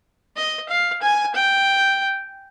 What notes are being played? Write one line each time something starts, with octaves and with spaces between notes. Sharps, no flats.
D#5
F5
G#5
G5